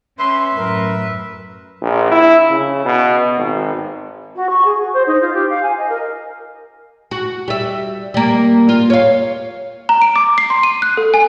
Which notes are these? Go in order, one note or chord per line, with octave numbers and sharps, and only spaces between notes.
C#4 B4 E5 C6
F#2 A2 A#4
A#1
E4
C#3
B2
G#1
F#4
C#6
G#4
F#4
C5
D#4
F4
G4
F5
G#5
D#5
A#4
F#4
G3 E5
G3 A#3
F4
C#5 F5
A#5
D7
D6
C7
C6
D#7
F#6
A4
G#5